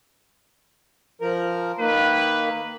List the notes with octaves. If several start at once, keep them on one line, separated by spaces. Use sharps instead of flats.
F3 A#4
D#3 A#3 B4